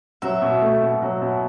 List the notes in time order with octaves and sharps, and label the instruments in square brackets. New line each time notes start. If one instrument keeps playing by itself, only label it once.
[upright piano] F#3 [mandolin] E5
[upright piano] B2
A3
B2
F#3
B2